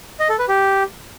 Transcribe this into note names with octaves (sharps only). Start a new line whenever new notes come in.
D#5
A4
B4
G4